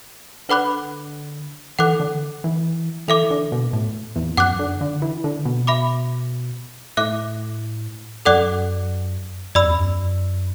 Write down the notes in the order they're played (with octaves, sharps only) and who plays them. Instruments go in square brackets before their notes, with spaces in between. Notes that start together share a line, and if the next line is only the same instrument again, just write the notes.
[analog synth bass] D3 [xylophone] B4 F#5 B5 D6 F#6
[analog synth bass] E3 [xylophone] A4 F#5 D6 F#6
[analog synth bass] D3
E3
[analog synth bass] E3 [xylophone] A4 E5 D6
[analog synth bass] D3
B2
A2
E2
[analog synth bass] F#2 [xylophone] F#5 D6 F#6
[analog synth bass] D3
D3
E3
D3
B2
[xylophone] E5 B5 D6
[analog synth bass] A2 [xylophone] E5 D6 F#6
[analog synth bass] F#2 [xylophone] A4 D5 F#5 D6 F#6
[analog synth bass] F#2 [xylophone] D5 B5 E6
[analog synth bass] E2
F#2